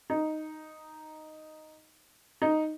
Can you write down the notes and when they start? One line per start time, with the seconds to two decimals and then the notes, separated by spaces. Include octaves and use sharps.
0.10 D#4
2.42 D#4